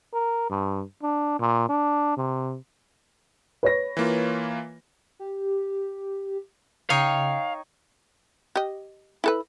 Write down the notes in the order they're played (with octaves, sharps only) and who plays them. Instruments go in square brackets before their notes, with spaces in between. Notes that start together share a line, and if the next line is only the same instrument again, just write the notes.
[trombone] A#4
G2
D4
A#2
D4
C3
[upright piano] B4 C#5 A#6
[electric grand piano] E3 A#3 F4
[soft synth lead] G4
[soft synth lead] C#3 [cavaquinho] D#4 C#5 G5 [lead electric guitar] F5
[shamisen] G4 D#5
E4 A4 B4